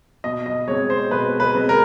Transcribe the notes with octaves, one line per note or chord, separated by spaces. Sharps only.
B2 D#5
D#5
G#3 C4 C#5
C5
B2 B4
B4
G#3 C4
A#4